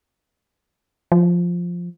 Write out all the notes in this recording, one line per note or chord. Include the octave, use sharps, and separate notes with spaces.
F3